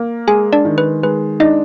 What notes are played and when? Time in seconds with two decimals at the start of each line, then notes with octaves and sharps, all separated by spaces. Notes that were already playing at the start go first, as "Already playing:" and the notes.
Already playing: A#3
0.28 G#3 G#4 G#5
0.53 D4 D5
0.65 D#3
0.78 B4
1.03 G#3 B4
1.40 D4 D#4 D#5